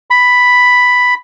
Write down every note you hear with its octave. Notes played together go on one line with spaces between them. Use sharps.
B5